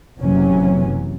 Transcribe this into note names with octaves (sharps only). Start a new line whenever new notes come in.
F#1 C3 E3 F#3 C#4